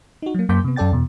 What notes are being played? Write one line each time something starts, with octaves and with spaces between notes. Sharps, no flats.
D#4 F#4
F#3 A#3
F#2 A#3 C6 D6 G6 B6
C3 B3
F#2 C#4 A4 D5 G5 A6
E2 B2